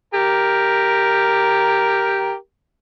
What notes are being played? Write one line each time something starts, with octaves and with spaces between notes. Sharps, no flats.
G4 A#4